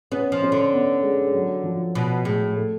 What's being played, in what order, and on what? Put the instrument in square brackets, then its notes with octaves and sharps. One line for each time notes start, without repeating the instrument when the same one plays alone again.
[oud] B3 [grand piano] C#4
[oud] F3
[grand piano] C#4
[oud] D3
[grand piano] B3
G#3
G#3
F#3
F3
[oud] B2
[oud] A2 [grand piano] G#3
[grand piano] A3